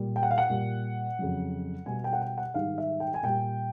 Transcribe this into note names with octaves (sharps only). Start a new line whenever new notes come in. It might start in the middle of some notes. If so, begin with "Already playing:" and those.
Already playing: A#2 G3
G5
F#5
F5
F#5
A#2 G3
F2 C#3 F#3
B2 G3 G#5
G5
F#5
G5
F#5
G#2 D#3 G3 F5
E5
G5
G#5
A#2 G3 G5